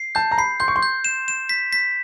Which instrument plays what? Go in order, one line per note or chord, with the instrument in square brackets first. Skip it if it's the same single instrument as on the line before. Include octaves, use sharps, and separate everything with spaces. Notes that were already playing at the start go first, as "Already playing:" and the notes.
Already playing: [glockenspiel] C7
[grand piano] A5 [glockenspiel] G6
[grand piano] A#5
[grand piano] B5 [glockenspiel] C7
[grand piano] C6 [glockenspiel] G6
[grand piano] C#6
C6
[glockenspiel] G6
E7
E7
B6
B6